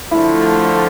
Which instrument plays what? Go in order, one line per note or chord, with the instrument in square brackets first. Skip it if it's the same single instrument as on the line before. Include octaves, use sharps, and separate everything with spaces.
[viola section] D3 F3 A3 [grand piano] E4